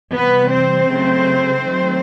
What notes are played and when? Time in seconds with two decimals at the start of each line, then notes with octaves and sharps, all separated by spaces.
0.13 C3 E3 G3 B3 B4
0.51 C4 C5
0.87 C#3 F#3 A3
1.60 D#3 F#3 A3